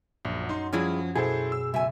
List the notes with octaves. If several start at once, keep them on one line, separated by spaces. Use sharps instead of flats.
A#1 F#2
D#4 C6
F3 G3 C#4 E4 G#4
B2 F#3 E4 G#4 A4 C5
E6
F#1 B1 E5 G#5